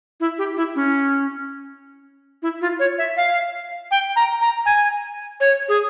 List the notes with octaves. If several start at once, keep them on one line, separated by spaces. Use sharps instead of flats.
E4
G4
E4
C#4
E4
F4
C#5
E5
F5
G5
A#5
A#5
G#5
C#5
G#4